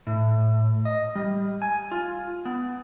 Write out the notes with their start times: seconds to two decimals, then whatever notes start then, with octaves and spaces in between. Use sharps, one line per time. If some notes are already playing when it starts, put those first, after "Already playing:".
0.07 A2
0.85 D#5
1.15 G3
1.62 G#5
1.91 F4
2.45 B3